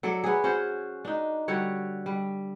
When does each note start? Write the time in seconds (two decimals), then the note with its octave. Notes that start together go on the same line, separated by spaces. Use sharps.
0.03 F#3 A4 D5
0.24 B3 G#4
0.44 C#4 F#4 C5
1.05 D4 D#4
1.48 D3 G3 F#4 C#5
2.06 G3